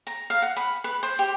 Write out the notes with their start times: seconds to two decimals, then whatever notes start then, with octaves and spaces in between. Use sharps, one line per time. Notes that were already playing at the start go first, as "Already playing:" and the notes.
0.07 A#5
0.30 F5
0.42 F#5
0.57 B5
0.84 B4
1.03 C5
1.19 G4